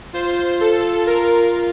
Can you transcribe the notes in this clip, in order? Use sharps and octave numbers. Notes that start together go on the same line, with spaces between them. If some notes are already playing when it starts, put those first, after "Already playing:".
F4 C5
A4
A#4